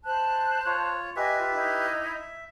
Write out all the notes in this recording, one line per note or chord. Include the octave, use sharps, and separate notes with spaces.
C5 A5 F#6
F4 C#5
G4 B4 D#5 E5 G#5
F4
D#4 E4
E5